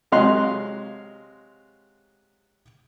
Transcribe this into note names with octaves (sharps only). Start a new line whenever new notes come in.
C3 F#3 G#3 F5 C6 F#6